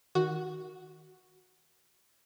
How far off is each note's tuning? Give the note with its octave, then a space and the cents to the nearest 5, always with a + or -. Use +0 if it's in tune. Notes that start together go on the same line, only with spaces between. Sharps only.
D#3 +10 F#4 +0